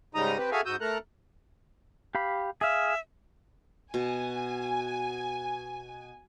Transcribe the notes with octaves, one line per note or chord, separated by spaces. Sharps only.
G#2 C#3 G3 D#4 A#5 D#6
C4 G4 B4
F#4 G#4 A4 E5 F5 G#5
G#2 F#4 D#6 E6 G6
A3 A4 A#4 A#5 F#6
G4 F5 B5
G#4 E5 F5
B2 G#5